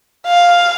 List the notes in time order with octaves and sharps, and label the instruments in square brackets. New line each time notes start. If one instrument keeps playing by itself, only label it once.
[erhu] F5